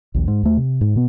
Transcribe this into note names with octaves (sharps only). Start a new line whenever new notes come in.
A#1 D#2
G#2
D#2 A3
C3
G#2
B2 B3